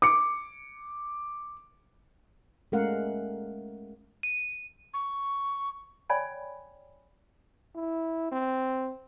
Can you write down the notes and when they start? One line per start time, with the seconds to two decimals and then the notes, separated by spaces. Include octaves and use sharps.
0.02 D6 C#7
2.72 G#3 A3 C#4 A#4 F5 F#5
4.23 D#7
4.94 C#6
6.10 C#5 D5 G5 G#5 B5
7.75 E4
8.32 C4